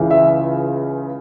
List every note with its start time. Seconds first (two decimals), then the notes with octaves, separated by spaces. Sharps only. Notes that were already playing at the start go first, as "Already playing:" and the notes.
Already playing: C#2 C#3 E3
0.11 E5